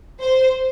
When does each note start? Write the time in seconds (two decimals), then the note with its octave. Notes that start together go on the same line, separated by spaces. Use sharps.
0.20 C5